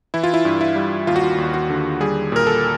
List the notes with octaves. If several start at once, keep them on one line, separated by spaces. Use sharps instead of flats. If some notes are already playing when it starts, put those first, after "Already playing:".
E3 E4
F4
E4
G2
E4
G3
D#2 F4
F#4
F4
D#2
F#4
D3
G3 G#4
A#2 A#4
A4